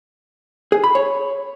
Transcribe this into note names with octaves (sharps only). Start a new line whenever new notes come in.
G#4
B5
C#5